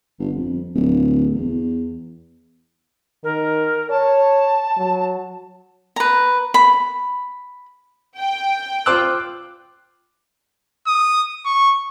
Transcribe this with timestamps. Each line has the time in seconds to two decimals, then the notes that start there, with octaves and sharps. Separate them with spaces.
0.19 G1
0.36 F2
0.75 D1
1.35 E2
3.24 D#3 A#4
3.90 C#5 A5
4.77 F#3
5.96 B4 A#5
6.54 B5
8.18 G5
8.86 F4 C5 D6 E6 F#6
10.87 D#6
11.45 C#6